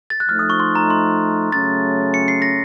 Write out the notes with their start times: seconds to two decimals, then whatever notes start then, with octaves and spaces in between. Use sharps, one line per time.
0.10 A6
0.20 F#6
0.28 F3 A3 D#4 F6
0.39 D#6
0.50 C#6
0.60 C6
0.75 A#5
0.90 C6
1.52 C#3 F#3 A3 C#4 A6
2.14 C#7
2.28 C7
2.42 A#6